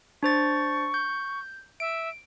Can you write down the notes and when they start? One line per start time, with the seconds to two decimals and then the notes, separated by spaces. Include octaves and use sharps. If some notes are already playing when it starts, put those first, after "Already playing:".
0.23 D4 C5 C#6 A6
0.94 G6
1.80 E5 D7